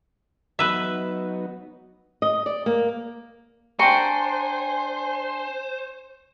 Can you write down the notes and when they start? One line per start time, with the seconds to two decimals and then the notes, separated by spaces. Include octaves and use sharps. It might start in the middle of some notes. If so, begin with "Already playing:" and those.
0.59 F#3 B3 D#4 B4 E5
2.22 D#5
2.46 D5
2.66 A#3
3.79 D4 C5 G5 G#5 A#5 C#6